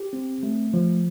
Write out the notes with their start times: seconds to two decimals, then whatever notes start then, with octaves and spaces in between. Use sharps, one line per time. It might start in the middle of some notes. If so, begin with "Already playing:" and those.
Already playing: G4
0.13 C4
0.43 A3
0.74 F3